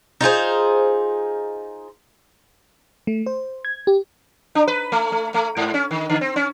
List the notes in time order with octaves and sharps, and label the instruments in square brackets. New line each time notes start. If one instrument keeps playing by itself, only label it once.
[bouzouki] D#4 F4 G#4 C5
[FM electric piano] A3
C5
G#6
G4
[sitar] D4
B4
A3
A3
A3
G#2
C#4
D#3
D3
C4
C#4